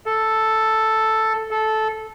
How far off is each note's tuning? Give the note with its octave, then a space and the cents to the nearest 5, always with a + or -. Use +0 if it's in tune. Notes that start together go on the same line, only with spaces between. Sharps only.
A4 +0
A4 -15